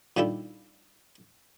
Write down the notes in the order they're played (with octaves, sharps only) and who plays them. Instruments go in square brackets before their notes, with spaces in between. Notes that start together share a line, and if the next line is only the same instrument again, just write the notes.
[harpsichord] A#2 D#3 G3 D4 E4 A4